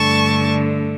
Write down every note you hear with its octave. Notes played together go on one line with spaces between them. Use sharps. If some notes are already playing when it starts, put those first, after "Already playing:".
Already playing: G2 D3 A3 A5 C#6